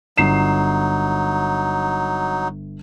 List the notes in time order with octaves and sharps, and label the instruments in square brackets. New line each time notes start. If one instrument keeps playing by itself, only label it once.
[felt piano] G1 C7 E7 [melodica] F#3 D#4